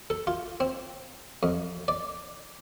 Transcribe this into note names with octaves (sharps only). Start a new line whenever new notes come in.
A4
F4
C4
F2
D5